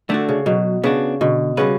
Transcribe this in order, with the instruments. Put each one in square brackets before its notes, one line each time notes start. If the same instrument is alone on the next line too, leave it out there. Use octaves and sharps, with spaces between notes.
[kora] D3 [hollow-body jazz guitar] A3 D4 F#4
[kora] C#3
[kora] B2 [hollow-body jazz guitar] F#3
[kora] C#3 [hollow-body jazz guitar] B3 D4 F#4
[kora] B2 [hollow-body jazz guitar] D3
[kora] C#3 [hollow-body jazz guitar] G3 C#4 F#4 B4